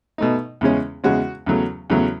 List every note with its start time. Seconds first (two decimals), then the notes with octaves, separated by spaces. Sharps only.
0.18 B2 A3 D#4
0.61 E2 C#3 G#3 C#4
1.04 E2 C#3 G#3 C#4 F#4
1.46 E2 C#3 F#3 A3
1.90 E2 C#3 F#3 A3